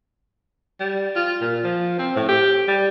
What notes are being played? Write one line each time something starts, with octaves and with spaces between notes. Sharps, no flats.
G3
F4
A#2
F3
C4
A2
G4
G3